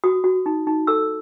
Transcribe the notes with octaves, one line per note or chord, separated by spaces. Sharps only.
F#4 D#6
F#4
D#4
D#4
A4 E6